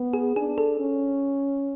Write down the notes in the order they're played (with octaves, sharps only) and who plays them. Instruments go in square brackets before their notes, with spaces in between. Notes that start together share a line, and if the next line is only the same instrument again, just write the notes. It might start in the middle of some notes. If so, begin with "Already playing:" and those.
Already playing: [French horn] B3
[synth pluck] G#4
[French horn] D4 [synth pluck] G#4
[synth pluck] A4
[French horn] C#4